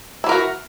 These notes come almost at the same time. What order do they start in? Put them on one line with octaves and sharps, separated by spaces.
E4 E3 A#4 F#4